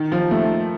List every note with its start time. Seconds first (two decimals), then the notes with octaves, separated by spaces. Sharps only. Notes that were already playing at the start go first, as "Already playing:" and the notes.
Already playing: D#3
0.12 F3
0.31 A3